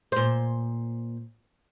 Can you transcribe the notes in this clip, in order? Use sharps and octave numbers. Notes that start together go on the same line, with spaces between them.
A#2 C5